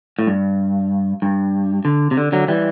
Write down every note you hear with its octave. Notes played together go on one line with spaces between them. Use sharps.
A2
G2
G2
D3
C3
D3
D3 F#3
E3 G3